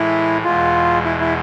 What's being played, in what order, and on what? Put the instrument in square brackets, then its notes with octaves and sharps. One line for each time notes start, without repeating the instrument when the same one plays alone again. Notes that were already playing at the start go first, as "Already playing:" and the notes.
Already playing: [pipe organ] A2 E3 G#3 [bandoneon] E4
[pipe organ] E2 B2 G#3 [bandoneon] F4
[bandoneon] E4
E4